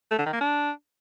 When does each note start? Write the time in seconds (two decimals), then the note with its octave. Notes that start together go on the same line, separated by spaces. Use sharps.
0.11 A3
0.19 D3
0.26 D#3
0.33 A#3
0.41 D4